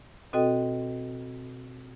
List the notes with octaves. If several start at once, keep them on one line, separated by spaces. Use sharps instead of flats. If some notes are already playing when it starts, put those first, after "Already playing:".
B2 C4 F#4 A4 D#5 G5